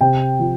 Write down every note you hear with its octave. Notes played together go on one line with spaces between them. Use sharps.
C3 G5
F3